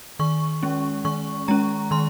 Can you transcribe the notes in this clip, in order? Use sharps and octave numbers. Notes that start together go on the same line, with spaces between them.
D#3 C#6
G#3 C#4
D#3 C#6
G#3 C#4 A#5
D#3 C6